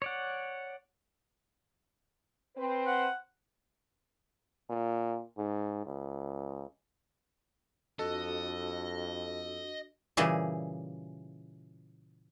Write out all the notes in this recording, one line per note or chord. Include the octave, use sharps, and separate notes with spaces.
C#5 D5 F#5
C4 B4 C5
F#5
A#2
G#2
C#2
F2 D4 F#4 A4 D#5 C#6
A#2 C#3 E3 G3 E4 G#4